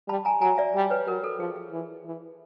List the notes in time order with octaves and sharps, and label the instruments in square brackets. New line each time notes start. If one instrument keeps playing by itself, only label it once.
[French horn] G3 [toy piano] A5 B5
[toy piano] G#5 A#5
[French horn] F#3 [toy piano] G#5 A#5
[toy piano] D5 E5
[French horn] G3
[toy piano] B4 C#5
[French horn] F#3 [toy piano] A#4
[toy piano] A4
[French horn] F3 [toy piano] G#4
[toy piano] G#4
[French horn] E3
E3